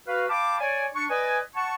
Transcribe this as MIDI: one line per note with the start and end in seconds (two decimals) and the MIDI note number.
0.07 0.26 66
0.07 0.26 71
0.07 0.26 77
0.29 0.59 77
0.29 0.59 79
0.29 0.59 81
0.29 0.59 83
0.29 0.59 86
0.60 0.87 73
0.60 0.87 74
0.60 0.87 80
0.94 1.07 62
0.94 1.07 85
1.09 1.39 71
1.09 1.39 74
1.09 1.39 75
1.09 1.39 80
1.55 1.74 78
1.55 1.74 81
1.55 1.74 85